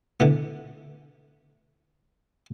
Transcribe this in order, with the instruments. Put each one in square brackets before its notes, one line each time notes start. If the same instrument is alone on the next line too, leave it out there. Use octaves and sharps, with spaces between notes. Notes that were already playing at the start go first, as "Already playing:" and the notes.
[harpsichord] D3 E3 B3